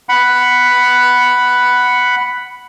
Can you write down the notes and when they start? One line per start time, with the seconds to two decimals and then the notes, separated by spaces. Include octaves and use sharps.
0.09 F#5 B5